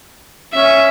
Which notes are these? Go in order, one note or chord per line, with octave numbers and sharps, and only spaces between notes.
C#4 E5